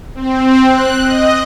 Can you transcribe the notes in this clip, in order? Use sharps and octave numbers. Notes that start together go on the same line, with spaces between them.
C4
F#6
D#5